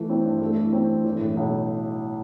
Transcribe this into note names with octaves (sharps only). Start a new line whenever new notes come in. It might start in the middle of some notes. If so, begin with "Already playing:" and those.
Already playing: E3 A3
C4
G2
A3
E3
C4
G2
E3
A2
B1